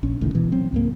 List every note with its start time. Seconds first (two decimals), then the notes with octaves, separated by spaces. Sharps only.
0.03 A#1 C#4
0.20 F1 C#2 A2 D#3
0.35 B2 E3
0.52 F#3 C4
0.72 C#2 G#2 A#3